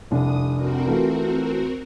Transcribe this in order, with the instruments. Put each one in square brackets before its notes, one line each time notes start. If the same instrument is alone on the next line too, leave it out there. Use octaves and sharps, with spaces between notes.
[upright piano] F1 C2 D4 [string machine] D#6
[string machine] C4 F#4 A#4
[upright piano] E3 A3 F4